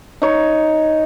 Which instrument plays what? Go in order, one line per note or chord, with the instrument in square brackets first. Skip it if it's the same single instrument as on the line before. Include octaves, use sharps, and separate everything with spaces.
[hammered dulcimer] D#4 C#5